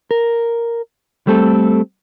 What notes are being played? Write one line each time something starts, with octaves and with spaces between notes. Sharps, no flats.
A#4
G3 A3 C4 A4